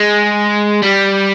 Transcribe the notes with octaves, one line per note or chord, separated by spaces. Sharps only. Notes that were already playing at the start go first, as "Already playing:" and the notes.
Already playing: G#3
G3